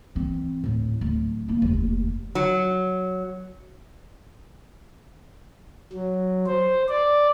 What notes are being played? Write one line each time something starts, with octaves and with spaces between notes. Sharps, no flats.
E3 C4
D1 A2
D1
A#3 E4
F1 D#2
F#3
F#3
C5
D5